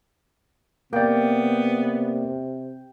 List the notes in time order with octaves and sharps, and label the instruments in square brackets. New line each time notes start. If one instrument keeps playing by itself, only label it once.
[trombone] C3 [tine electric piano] A#3 D5 [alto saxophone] B3 [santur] G5